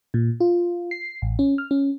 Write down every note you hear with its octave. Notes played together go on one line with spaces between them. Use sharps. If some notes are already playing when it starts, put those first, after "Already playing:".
A#2
F4
C7
A1
C#4
F6
C#4